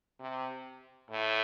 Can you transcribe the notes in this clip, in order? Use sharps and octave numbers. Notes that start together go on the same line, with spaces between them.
C3
A2